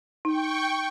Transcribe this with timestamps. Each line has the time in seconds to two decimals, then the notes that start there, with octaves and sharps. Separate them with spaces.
0.25 D#4 G5 C#6